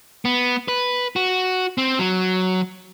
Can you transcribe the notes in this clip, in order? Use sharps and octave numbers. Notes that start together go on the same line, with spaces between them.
B3
B4
F#4
C4
F#3